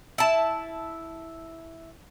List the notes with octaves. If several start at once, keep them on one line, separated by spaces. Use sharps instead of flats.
E4 A5